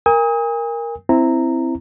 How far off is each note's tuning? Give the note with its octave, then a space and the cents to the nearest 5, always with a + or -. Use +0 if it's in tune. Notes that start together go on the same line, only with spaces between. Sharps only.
A#4 +0 G#5 -35 D#6 +30
C4 +0 E4 +0 A#5 -15